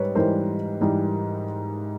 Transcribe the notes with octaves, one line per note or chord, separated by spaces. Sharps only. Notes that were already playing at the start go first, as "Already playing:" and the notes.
Already playing: G#2 G3 B4 C#5
G#2 E3 G3 A#4 C5
G#2 E3 G3